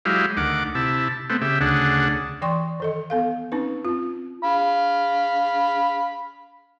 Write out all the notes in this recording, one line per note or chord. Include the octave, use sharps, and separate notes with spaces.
F#3 G#3 E4 G4 F5
D2 D#3 F#5 D6
C3 E4 A5
A3 B3 C4
C#3 G4 E5
D2 C#3 D4 G#4 F#5
E3 D5 G5 C6 C#6
D#3 A4 D#5
B3 A4 F5
C4 C#4 D#4 B4
C4 F4
F5 B5